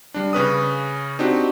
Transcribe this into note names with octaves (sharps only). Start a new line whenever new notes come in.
G3 D4
C#3 C#4 B4 D#6
C4 D4 D#4 F#4 G4